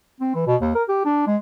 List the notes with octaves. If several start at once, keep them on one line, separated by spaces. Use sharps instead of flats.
C4
E3
B2
D#2
A#4
G4
D4
G#3